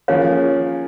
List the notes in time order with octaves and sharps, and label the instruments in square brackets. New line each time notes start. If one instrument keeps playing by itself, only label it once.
[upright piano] F3 A#3 C#4 G#4 [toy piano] C#5 F5